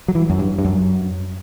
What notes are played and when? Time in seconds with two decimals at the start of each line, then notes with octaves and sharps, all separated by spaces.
0.08 F#3
0.15 E3
0.30 F#2
0.39 G2
0.58 G2
0.65 F#2